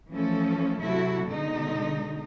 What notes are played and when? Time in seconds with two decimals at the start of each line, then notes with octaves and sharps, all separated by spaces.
0.11 E3 F3 A3 C#4 A4
0.82 C3 F#3 E4 F#4 A4
1.28 B2 D3 G#3 D#4